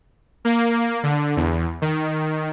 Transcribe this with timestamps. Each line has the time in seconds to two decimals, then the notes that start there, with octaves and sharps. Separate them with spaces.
0.45 A#3
1.03 D3
1.37 E2
1.82 D#3